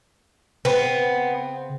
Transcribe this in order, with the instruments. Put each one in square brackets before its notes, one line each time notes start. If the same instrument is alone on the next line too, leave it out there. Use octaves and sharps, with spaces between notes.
[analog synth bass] C#3 [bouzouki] B3 [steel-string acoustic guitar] C4